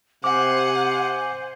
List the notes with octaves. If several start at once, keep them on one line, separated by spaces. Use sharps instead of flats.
C3 C5 F#5 G#5 D6